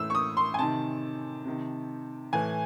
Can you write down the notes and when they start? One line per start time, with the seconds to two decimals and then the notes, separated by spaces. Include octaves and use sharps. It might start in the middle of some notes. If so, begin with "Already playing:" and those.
Already playing: A2 E3 E6
0.10 C#6
0.15 D#6
0.37 C6
0.54 G#5
0.59 C3 D#3 A5
1.45 C3 D#3
2.33 A2 E3 G#5